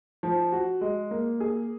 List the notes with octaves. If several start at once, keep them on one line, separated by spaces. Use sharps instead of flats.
F3
F#4
G#3
A#3
G#4